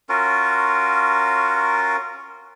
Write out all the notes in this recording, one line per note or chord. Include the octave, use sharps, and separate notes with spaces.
C#4 F4 F#4 A#4